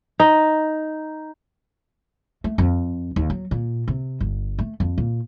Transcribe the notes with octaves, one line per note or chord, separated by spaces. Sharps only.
D#4
A3
F2
D#2
F#3
A#2
C3
G1
A3
F2
A#2